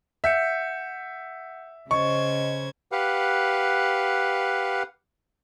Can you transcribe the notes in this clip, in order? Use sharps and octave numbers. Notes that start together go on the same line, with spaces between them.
E5 F#5 G6 C#7
C#3 C5 D#5 C#6 G#6
G4 B4 F5 F#5